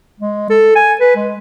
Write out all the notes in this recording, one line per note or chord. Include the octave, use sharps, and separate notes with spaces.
G#3
A4
G#5
B4
G#3